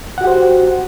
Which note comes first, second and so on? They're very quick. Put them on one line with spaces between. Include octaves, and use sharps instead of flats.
F#5 F#4 G4 C5